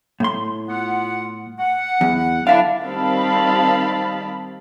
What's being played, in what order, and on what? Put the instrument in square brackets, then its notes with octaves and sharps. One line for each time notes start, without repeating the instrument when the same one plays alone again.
[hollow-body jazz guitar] A2 C6
[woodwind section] B3 F4 F#5
F#5
[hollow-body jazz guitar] E2
[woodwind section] D3 F#3 D4 [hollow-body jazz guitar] E4 E5 F5
[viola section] D#3 G3 C4 F5 A5 B5